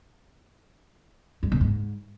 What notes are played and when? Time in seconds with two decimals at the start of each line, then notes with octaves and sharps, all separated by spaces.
1.43 G2
1.52 B2
1.61 G#2